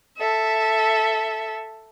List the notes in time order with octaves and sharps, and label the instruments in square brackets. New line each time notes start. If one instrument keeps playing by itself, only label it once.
[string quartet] A4 E5